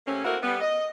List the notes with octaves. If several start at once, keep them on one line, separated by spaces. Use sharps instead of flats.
C3 A3 A#3 C#4
A3 A#3 C4 E4 F#4 A#4
G3 B3
D#5